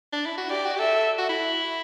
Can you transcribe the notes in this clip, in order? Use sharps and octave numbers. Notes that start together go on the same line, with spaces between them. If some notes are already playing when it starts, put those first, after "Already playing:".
D4
E4
F#4
G4 D5
F#4
G4
A4 E5
F#4
E4